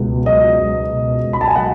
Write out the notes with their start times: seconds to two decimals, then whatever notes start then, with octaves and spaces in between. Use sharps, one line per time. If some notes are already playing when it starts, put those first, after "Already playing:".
Already playing: C#2 B2
0.26 F#3 D#5
0.59 C#2
0.91 B2
1.23 C#2
1.33 B5
1.41 A5
1.48 G#5
1.56 F#3 F#5